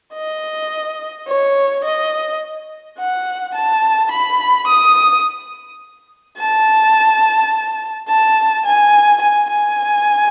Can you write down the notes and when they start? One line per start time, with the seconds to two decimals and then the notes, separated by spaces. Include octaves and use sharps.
0.14 D#5
1.28 C#5
1.84 D#5
2.98 F#5
3.54 A5
4.11 B5
4.68 D#6
6.38 A5
8.08 A5
8.65 G#5
9.22 G#5
9.50 G#5